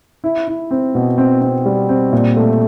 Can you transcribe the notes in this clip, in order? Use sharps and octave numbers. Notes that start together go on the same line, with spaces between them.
E4
E4
C4
B2
C4
C4
G3
C4
A#2
A3